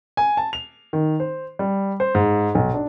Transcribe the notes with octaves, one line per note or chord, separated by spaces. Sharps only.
G#5
A5
F7
D#3
C5
G3
C5
G#2
B1
D4